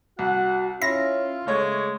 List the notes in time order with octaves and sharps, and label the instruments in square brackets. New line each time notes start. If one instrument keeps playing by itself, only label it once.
[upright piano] C2 [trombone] F#4 [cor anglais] F#5
[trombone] C#4 [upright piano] E4 [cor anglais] F4 [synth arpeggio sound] A#6
[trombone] C#3 [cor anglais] G#3 [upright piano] A3 C#5